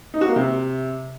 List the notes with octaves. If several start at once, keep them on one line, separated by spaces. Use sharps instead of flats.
D#4
F#4
A#3
C3